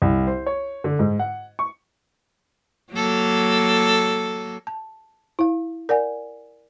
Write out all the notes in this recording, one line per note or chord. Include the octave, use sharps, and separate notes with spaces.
C2
C5
C#5
D3
G#2
F#5
C#6
F#3 A#3 A4
A5
E4 F5
A#4 D5 F#5 G#5